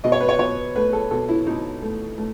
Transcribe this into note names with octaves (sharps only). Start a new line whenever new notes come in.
B2 D#5
C#5
B4
C#5
B2 C#5
A3 B4
A4
B2 A4
E4
B2 D#4
A3
A3